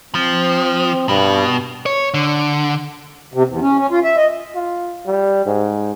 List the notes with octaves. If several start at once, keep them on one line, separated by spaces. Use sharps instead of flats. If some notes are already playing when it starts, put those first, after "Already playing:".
F3 C4
G2 B2
C#5
D3
C3
E2
C#4
C#4
F4
E5
D#5
F4
G3
G#2